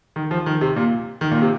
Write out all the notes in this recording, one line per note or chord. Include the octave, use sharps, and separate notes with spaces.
D#3
F3
D#3
C3
A#2
D#3
A#2
C3